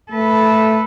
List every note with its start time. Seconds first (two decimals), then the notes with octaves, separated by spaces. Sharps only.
0.12 A3 A4 B4